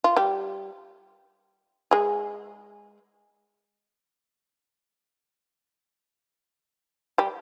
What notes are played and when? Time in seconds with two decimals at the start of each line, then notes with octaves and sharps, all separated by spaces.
0.04 F4
0.16 G3 G4
1.91 G#3 G#4
7.18 G3 G4